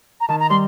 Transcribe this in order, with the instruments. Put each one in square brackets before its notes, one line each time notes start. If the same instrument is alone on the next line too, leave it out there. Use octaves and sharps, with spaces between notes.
[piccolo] A#5
[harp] D#3 [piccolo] A5
[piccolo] A#5
[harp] G3 [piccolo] C6